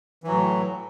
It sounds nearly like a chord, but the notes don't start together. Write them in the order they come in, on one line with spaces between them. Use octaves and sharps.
E3 F#3 A2